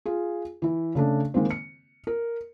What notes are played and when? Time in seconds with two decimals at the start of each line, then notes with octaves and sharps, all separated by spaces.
0.06 F4 G#4
0.62 E3 E4
0.95 C#3 A3 D4
1.34 D#3 G#3 A#3 C4
1.51 C#7
2.07 A#4